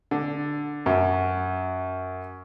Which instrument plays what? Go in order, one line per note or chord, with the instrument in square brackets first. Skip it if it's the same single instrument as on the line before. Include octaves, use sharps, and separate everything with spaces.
[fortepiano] D3
F#2